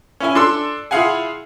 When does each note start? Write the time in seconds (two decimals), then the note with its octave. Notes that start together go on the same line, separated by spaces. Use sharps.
0.20 C#4 E4 G#5
0.35 D4 A4 C6 E6
0.91 E4 F4 G#4 F5 F#5 G#5